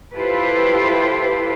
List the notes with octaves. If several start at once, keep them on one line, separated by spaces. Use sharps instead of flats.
E4 F4 G4 A4 B4 C5